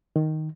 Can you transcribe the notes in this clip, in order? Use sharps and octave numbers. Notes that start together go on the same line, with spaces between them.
D#3